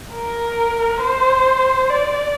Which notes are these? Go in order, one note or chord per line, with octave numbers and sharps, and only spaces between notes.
A#4
C5
D5